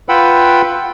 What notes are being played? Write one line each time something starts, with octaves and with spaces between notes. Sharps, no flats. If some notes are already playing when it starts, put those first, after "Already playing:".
F4 B4 F#5 G5 B5 E6